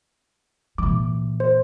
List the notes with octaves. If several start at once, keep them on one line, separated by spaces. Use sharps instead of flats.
A#2 E3 D6
C5